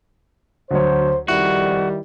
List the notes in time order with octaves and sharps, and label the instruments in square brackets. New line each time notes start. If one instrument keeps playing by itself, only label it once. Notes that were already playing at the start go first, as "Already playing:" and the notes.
[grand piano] D2 F#3 C#5 [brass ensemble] C5
[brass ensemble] F#1 F2 [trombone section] D#3 G3 [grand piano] E4 [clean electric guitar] F#4